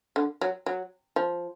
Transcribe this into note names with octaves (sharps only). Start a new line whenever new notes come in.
D3
F#3
F#3
F3